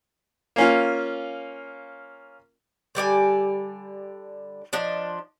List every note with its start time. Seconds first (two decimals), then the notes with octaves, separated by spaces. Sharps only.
0.56 A#3 C#4 F4
2.95 D3 G3 D5 G#5
4.73 F3 D4 D#5